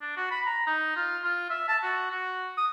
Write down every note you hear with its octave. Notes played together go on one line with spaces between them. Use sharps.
D4
F#4
B5
A#5
D#4
F4
F4
E5
A5
F#4
F#4
D#6